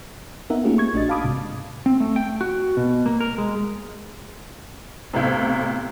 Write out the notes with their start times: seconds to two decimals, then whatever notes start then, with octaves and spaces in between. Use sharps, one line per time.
0.50 B3 D#4 A#4 E5 F#5
0.64 A3 A#3 C#4 F4 G4 G#4
0.78 C#6 G#6
0.94 A#1 D4 F#4 D#5 A6
1.09 F5 A5 B5 D6 D#6
1.24 G#2 C3
1.86 C4
2.00 A3
2.16 G5
2.41 F#4
2.77 B2
3.06 A#3
3.21 A#4
3.38 G#3
5.13 B1 A2 C3